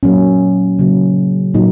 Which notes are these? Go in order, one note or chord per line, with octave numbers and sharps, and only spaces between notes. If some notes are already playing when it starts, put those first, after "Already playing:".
A#2 F#3 A#3 C#4
C#3 F#3 A#3
A#2 F#3 A#3 D#4